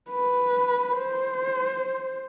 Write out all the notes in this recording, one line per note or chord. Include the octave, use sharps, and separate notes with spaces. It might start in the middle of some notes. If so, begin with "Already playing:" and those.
B4
C5